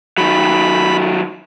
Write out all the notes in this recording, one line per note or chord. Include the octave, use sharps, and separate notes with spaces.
D#3 F#3 B5